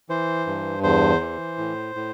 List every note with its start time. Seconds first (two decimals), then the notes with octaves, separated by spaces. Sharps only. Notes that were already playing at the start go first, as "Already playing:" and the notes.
0.09 E3 C5
0.47 G2
0.83 E2 C5
1.21 E3
1.58 A2
1.95 A2